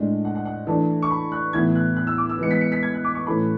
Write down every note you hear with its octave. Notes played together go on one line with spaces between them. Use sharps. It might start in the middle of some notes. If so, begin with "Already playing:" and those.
Already playing: A2 G#3 D4
F#5
F#5
F#5
E3 A3 D4 A5
C#6
B5
F#6
A2 E3 B3 E4 G#6
F#6
F#6
E6
D6
E6
E3 G#3 B3 C#7
B6
C#7
B6
G#6
F#6
D6
C#6
A2 E3 A3 C#4 B5